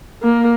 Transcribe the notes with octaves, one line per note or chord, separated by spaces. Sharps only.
A#3